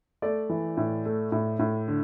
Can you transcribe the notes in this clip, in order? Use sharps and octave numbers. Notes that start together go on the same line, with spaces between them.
A3 D5
E3
A2
A3
A2
A2
D3